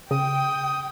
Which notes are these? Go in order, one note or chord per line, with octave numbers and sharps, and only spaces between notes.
C#3 G5 D#6